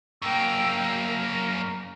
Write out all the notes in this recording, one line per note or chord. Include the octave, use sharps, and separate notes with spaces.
F#2 A#3 G5 E6
A#4